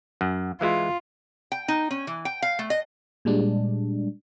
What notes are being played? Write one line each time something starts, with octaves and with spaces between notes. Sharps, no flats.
F#2
E3 G#3 E4 F4
G5
D#4
C#4
E3
G5
F5
A3
D#5
A#2 G3 G#3 D4